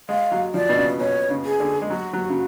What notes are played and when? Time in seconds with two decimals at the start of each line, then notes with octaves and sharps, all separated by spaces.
0.09 G#3 F5
0.31 F#3
0.54 F3 D5
0.69 B2
0.77 C#3
0.99 B2 C#5
1.30 C#3
1.45 G#4
1.60 D3
1.82 G#3
1.90 F#3 F#4
2.13 F#3
2.30 C#3